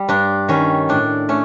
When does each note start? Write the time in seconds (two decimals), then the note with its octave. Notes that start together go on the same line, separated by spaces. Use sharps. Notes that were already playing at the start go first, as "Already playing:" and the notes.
Already playing: G3
0.09 G2 D4
0.49 D#3 G3 C#4
0.89 A2 D4
1.29 A3 C#4